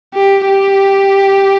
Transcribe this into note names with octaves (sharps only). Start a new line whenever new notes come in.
G4
G4